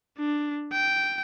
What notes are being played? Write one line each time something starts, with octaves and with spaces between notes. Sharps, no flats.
D4
G5